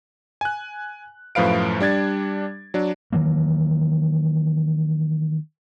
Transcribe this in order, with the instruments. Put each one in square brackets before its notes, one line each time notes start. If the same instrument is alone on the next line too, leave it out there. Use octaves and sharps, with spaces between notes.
[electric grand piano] G#5 F#6
F#2 A2 F3 B4 F5 D7
G3 D4 G#6 A6
F#3 D4
[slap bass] D#3 E3 F#3 A#3